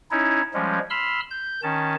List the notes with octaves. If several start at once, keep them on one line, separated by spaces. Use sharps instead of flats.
C#4 D#4 E4 C#5
F3 G3 G#3 C#4
B5 C6 E6 F6
G6
D#3 C#4 A5